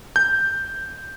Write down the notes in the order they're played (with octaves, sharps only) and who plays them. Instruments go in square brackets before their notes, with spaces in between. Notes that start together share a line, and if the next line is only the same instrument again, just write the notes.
[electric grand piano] G6